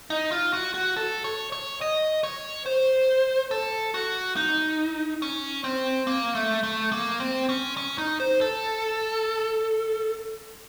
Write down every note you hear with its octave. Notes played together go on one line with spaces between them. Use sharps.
D#4
F4
F#4
F#4
A4
C#5
C#5
D#5
C#5
C5
A4
F#4
D#4
C#4
C4
A#3
A3
A3
A#3
C4
C#4
C#4
D#4
C5
A4